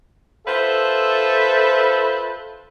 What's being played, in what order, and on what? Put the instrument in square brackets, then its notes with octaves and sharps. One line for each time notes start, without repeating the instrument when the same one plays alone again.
[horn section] F4 A4 B4 C5 E5